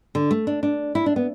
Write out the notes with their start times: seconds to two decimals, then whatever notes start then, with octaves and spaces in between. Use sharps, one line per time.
0.15 D3
0.31 A3
0.47 D4
0.63 D4
0.95 E4
1.06 D4
1.16 B3